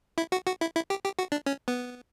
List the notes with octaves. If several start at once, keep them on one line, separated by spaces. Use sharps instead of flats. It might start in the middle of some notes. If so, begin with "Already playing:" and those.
E4
F#4
F#4
E4
E4
G4
G4
F#4
D4
C#4
B3